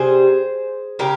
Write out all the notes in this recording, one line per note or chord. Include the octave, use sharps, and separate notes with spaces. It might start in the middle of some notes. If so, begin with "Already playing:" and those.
Already playing: C3 G3 G#4 C5
C#3 G#3 G4 A#4